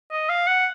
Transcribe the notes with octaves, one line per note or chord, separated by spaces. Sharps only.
D#5
F5
F#5